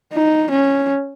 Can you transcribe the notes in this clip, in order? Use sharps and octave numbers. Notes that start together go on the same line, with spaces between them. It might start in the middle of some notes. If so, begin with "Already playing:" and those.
D#4
C#4